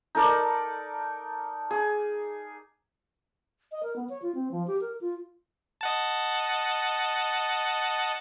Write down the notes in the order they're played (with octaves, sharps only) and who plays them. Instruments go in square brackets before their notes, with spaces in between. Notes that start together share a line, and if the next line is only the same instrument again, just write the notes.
[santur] D#4 A4 A#4 D5
G#4
[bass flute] D#5
A#4
B3
C#5
F4
C4
F3
G4
A#4
F4
[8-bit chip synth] D#5 F#5 A5